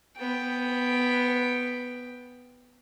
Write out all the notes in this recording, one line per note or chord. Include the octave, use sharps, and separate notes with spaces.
B3 G5